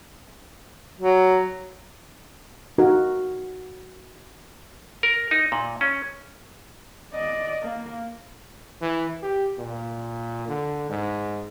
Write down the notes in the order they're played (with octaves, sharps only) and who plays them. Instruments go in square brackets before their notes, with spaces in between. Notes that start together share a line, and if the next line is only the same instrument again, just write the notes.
[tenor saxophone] F#3
[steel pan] D#4 F#4 A#4
[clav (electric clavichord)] A#4
D#4
A#2
C#4
[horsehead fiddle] D5 D#5
A#3
[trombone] E3
G4
A#2
D3
G#2